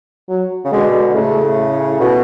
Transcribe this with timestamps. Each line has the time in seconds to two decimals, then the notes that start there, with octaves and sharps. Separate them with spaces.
0.29 F#3
0.65 C#3
0.72 B2 D3 G#3
1.09 D3
1.14 A2 C#3 A3
2.00 B2